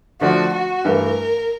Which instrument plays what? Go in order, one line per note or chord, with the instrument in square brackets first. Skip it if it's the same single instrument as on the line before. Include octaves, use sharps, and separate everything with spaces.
[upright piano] D3 F3 A3 D4 [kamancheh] F#4
[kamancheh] F#4
[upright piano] G2 E3 A3 [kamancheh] A#4